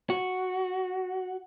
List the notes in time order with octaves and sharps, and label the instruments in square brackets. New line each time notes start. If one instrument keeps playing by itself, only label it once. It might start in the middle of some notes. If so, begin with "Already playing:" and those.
[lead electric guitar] F#4